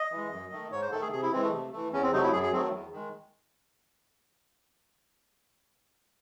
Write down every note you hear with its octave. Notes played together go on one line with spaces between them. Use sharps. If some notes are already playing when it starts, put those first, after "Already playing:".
Already playing: D#5
E3 G#3
F#2
D#3 A3
G#2 C#5
C5
D#3 A3 A4
G#4
C3 G#4
E4
E3 G#3 C4
A3
C3
E3 A3
E2 C#4
C4
C3 F#3 A3 D#4
E4
F#2 G#4
G#4
D#3 F#3 A3 C4
E2
D#3 G#3